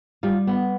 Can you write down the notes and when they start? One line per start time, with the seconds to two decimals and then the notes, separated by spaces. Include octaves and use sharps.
0.23 G3 F4
0.47 B3